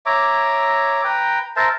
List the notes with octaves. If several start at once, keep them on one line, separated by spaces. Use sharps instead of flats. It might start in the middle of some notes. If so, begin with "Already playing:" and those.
C#5 E5 A#5 D6
B4 G5 A#5
A#4 C5 E5 A5